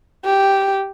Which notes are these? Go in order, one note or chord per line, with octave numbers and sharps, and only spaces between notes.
G4